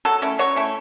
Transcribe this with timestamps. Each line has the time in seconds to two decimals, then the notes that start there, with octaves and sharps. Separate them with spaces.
0.05 F#3 A4
0.22 A3 C#4 E4
0.39 F#3 C#5
0.56 A3 C#4 E4